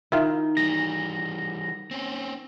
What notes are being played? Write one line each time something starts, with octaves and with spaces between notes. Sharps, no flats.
D#3 E4 F4
E3 G3 A#6
C4 C#4